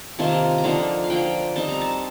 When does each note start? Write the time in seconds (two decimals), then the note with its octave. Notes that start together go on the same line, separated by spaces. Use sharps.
0.19 C3 D#3 A#3 F4 A5
0.58 A#5
0.64 D3 F3 A#3 D#4 A5
1.04 F5
1.10 D3 F3 A#3 G5
1.55 G3 C4 D#4 A5
1.69 A#5
1.82 A5